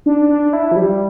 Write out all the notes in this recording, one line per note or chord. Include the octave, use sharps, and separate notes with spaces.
D4
D4
E4
F3
G3